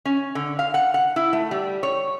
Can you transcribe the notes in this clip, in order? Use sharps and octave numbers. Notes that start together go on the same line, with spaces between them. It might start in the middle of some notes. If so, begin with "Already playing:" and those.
C#4
D3
F5
F#5
F#5
E4
A3
G3
C#5